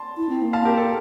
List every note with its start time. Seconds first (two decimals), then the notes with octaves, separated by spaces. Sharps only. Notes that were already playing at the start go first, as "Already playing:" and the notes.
Already playing: A5 C6
0.17 E4
0.29 C4
0.42 A#3
0.53 F5 A5
0.65 G4 A#4
0.77 A4